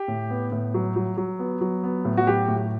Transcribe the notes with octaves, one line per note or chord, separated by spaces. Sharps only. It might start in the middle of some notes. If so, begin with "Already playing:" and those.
Already playing: G4
A2
B3
A2
F#3
F#3
F#3
B3
F#3
B3
A2
F#4
F#3 G4
A2